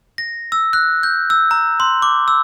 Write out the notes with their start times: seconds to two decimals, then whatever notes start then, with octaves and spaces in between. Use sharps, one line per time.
0.18 A#6
0.52 E6
0.73 F#6
1.03 G6
1.30 E6
1.51 A#5
1.80 C6
2.02 D6
2.28 E6